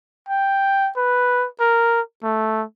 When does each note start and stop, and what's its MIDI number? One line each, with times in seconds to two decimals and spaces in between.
0.29 0.91 79
0.97 1.47 71
1.60 2.01 70
2.23 2.63 57